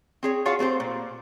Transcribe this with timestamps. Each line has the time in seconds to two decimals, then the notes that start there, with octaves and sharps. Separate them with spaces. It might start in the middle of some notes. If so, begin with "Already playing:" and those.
0.23 C4 G#4 C#5
0.45 F4 F#4 G#4 C#5 F5 F#5
0.59 A3 C4 G4 C5
0.80 A#2